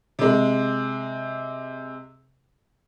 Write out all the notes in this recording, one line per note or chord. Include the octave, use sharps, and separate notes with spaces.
C3 G#3